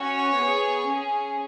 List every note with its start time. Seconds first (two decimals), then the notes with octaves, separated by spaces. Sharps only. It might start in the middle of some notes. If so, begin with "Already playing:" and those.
Already playing: C#4 F#4 C#5
0.37 B3 G#4
0.88 C#4 G#4